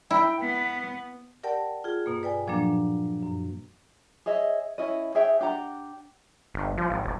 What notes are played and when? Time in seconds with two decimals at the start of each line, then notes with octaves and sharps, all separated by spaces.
0.11 E4 G5
0.42 B3 B6
1.43 G4 A#4 D5 F#5 G5 A5
1.84 F4 G#4
2.06 G2 B2 A#3
2.23 B4 D5 G5 G#5
2.47 A#2 F3 F#3 A#3 D4
3.23 F#2
4.26 G#4 C#5 D#5 E5
4.78 C#4 E4 D#5
5.15 G#4 C#5 E5 G5
5.41 D4 G4 F#5 A#5
6.54 G1
6.78 F3
6.90 G#1
7.04 D#1